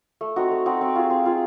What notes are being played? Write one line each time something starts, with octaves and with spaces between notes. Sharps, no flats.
A3
C4 D#4 F#4
A3
C4 D#4 F#4
C4
F4 G#4
C4
F4 G#4